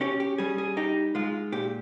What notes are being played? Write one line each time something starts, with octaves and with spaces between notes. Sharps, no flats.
C#4 G4
G4
G3 G#4
G#4
D#4 G4
G#3 F4
A#2 G4